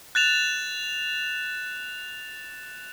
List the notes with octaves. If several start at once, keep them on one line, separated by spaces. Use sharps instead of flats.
F#6 A6 E7 F7